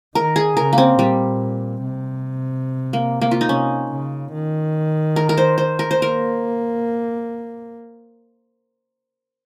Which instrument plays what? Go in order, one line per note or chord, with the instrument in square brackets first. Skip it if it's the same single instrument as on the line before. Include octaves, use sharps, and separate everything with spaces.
[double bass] D#3 [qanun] A#4
[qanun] G#4
[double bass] C#3 [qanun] A#4
[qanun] A#3
C4
[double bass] A#2 [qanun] G3
[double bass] C3
[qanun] A#3
A#3
F4
D#4
[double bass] C3 [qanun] C#4
[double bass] C#3
D#3
[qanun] A#4
A#4
C5
C5
A#4
C5
[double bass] A#3 [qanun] A#4